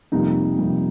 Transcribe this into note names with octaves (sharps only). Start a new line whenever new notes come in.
F2 C3 G3 A#3 D#4
F2 C3 G3 A#3